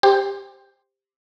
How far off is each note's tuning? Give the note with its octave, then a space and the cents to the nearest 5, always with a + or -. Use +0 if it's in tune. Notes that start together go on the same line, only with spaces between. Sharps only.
G4 +10 C5 +0